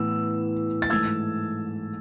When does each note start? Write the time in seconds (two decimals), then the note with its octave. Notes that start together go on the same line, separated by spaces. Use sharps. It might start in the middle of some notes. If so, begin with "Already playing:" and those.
Already playing: A2 E3 B3 E6
0.82 A6
0.90 G#2 E3 A3 E6 G#6